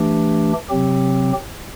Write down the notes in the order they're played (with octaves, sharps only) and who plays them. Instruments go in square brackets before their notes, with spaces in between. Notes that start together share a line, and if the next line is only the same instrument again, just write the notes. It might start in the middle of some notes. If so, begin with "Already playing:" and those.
Already playing: [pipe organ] E3 A3 D4 G4
C3 F#3 C4 G4